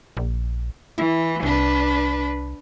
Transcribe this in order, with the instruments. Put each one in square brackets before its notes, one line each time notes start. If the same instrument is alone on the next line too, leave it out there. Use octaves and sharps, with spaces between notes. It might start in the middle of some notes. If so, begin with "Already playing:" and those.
[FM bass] A#1
[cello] E3 [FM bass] E4
[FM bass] C2 [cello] D4 B4